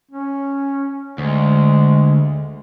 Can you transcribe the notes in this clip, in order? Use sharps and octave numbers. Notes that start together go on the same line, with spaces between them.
C#4
D2 G#3